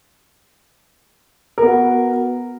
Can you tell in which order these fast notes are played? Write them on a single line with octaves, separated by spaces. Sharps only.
A#4 B3 F#4